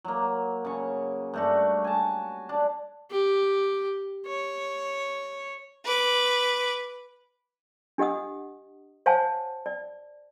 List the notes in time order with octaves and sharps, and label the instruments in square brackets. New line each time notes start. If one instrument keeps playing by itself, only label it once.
[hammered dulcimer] F#3 A#3
C#3 C#6
G2 A3 F#4
G#5 A5
D4
[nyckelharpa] G4
C#5
[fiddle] B4 D6
[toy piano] D4 G4 D#5 F#5 D#6
C5 C#5 F5 F#5 G#5 A5
D5